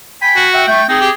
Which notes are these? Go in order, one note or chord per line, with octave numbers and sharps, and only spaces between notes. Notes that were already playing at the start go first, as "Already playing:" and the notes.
G5 G#5 B5
F#4
E5 F#5 G5
A3 G5
C4 D#4 G#4
G4